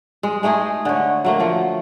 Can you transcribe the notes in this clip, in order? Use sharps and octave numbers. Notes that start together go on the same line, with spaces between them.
G#3
G#3 A3 D#4 G#4
D3 C#5
F#3 A3 A#3
F3 A3